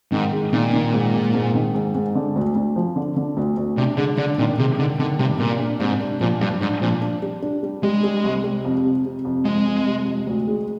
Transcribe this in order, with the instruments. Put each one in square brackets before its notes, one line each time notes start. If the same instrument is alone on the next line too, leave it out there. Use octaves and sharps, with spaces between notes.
[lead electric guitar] G#2 [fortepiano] D#3
[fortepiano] G#3
[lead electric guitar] A#2 [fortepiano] D#3
[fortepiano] D#3
G#2
G#2
G#2
D#3
G#2
G#2
D3
D2
D2
F3
D3
D3
D2
D2
[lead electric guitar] C3 [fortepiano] D4
[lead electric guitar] D3 [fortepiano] G#3
[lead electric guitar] D3 [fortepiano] D4
[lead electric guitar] A#2 [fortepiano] D#3
[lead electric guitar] C3 [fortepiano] G#3
[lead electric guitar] D3 [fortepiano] D#3
[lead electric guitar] D3 [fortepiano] D#3
[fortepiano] G2 [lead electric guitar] C3
[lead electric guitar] A#2 [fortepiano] A#3
[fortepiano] D4
[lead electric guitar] G#2 [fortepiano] C3
[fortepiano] D4
[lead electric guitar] A#2 [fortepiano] F3
[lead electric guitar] G2 [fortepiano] D4
[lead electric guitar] G#2 [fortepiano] D4
[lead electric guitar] A#2 [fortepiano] F3
[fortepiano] D4
G3
D4
G3
[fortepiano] G3 [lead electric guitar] G#3
[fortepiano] G3
C2
G3
F2
C3
C3
F2
[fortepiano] F2 [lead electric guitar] G#3
[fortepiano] F2
C3
F2
D2
G#3